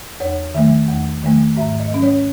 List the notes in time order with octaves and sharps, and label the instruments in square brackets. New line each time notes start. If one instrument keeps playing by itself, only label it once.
[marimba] E2 C#5
D#3 F#3 A3 E5
E2
D#3 F#3 A3
G#2 E5
D#5
F#3 C#4
C#5